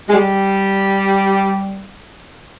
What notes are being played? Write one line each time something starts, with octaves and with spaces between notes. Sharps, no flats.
G#3
G3